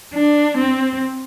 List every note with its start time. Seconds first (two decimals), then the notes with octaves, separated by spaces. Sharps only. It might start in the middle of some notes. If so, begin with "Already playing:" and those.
0.14 D4
0.57 C4